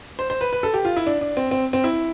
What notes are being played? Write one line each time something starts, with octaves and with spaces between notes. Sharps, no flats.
C5
C5
B4
B4
A4
G4
F4
E4
D4
D4
C4
C4
C4
E4